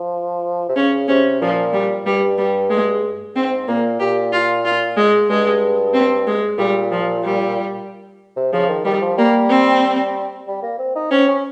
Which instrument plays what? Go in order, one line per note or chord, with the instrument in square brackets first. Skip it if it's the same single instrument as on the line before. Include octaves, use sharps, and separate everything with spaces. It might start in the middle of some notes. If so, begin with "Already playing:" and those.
Already playing: [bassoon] F3
C3
[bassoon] C#3 [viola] C#4
[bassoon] C3 [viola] C#4
[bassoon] A#2 [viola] F3
[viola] G3
[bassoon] G2 [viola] G3
[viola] G3
G#3
[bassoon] G#2 [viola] C4
[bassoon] A#2 [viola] A#3
[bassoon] A#2 [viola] G4
[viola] F4
F4
G#3
[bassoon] G2 [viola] G#3
[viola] C4
G#3
[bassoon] A#2 [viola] G3
[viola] F3
G3
[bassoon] C3
[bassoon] C#3 [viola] F3
[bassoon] D#3
[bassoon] D#3 [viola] G3
[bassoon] F3
[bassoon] G3 [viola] A#3
[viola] C4
[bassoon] G3
A#3
C4
D#4
[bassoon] C4 [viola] C#4
[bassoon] C#4